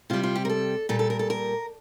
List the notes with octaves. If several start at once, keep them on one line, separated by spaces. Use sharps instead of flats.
C3 G3 F4
F4
G4
A#4
A4
A#2 G3 A4
A4
A#4
A4
A#4